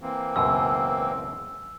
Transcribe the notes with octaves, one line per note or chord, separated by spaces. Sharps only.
E3 A#3 C4
C#2 F#2 B2 E6